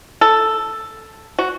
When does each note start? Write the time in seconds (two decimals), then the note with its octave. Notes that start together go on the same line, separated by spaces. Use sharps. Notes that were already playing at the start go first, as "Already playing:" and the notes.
0.21 A4
1.39 F#4